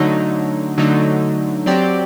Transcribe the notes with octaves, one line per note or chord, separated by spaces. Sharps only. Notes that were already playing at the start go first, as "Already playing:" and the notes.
Already playing: D3 F#3 A3 D#4
D3 F#3 A3 D#4
F#3 C4 G4 D5